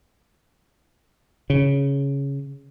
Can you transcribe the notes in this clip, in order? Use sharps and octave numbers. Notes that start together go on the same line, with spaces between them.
C#3